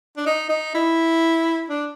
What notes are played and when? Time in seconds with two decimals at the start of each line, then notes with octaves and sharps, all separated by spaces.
0.17 D4
0.26 D#4
0.49 D#4
0.74 E4
1.69 D4